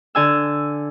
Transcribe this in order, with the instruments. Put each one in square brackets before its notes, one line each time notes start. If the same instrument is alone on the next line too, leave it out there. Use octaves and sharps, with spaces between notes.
[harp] D3 G#5 E6